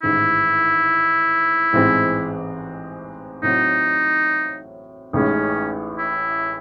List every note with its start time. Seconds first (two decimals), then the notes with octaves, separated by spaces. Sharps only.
0.03 A1 G#2 D#3 E4
1.73 A1 G#2 E3 G#3 C4
3.43 A2 F#3 C4 D#4 F#4
5.13 A1 A2 G#3 C#4 D#4
5.99 E4